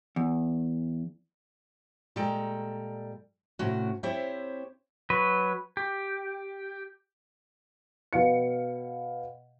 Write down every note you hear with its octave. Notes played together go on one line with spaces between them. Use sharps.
E2
A#2 G3 G#3 A4 G5 A#5
A2 C3 C#4 F#4
C4 E4 G4 C5 C#5 E5
F#3 B4
G4
B2 F5 C#7